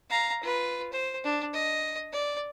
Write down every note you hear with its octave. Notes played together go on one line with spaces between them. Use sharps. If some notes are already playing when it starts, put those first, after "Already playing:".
F5 A#5
F4 B4
C5
D4
D#5
D5